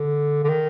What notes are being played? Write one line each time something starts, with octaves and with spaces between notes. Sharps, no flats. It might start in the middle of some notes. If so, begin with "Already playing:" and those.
Already playing: D3
D3
D#3